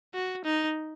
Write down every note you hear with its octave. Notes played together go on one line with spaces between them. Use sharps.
F#4
D#4